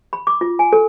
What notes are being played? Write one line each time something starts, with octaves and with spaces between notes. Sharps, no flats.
B5
D6
F4
G#5
A4